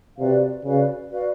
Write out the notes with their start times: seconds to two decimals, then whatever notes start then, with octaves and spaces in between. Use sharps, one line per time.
0.19 C3 F#4 B4 D5 F5
0.65 C#3 F#4 B4 D5 F5
1.10 F#4 B4 D5 F5